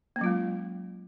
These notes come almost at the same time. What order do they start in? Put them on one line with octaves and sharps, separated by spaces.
A#3 C#4 F#3 F4 G#3